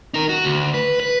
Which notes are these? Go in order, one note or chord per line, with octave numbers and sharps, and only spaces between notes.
D#4 A#4
F#4
D2
B4
B4